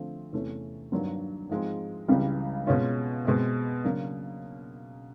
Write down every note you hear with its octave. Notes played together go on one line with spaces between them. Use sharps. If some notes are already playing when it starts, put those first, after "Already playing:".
Already playing: D3 F3 A3 C4
E2 C3 E3 A3 C#4
G2 D#3 F#3 A#3 D4
G#2 F3 G#3 C4
C#2 C#3 E3 G3
B2 G#3 C#4 F4
B2 G#3 C4
C#3 F#3 A#3 D4